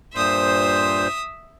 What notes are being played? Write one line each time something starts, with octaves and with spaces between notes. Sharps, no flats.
G2 A#2 C5 E5 D#6